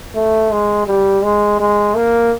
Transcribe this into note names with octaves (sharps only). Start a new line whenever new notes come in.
A3
G#3
G3
G#3
G#3
A#3